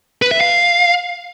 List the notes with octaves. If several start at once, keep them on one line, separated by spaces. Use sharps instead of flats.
B4
E5
F5